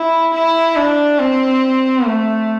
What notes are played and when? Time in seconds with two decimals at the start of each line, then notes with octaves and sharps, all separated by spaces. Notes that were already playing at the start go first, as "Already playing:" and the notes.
Already playing: E4
0.34 E4
0.76 D4
1.19 C4
2.06 A3